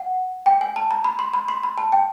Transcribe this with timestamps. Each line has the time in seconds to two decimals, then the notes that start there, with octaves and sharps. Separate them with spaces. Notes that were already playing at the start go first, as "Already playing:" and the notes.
Already playing: F#5
0.46 G5
0.61 G#5
0.76 A5
0.91 A#5
1.04 B5
1.19 C6
1.34 B5
1.48 C6
1.63 B5
1.78 A5
1.92 G5